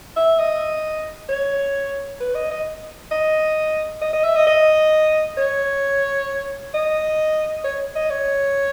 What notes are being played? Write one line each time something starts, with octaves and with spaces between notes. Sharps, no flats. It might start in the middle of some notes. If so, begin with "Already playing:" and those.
E5
D#5
C#5
B4
D#5
D#5
D#5
D#5
D#5
E5
D#5
D#5
C#5
D#5
C#5
D#5
C#5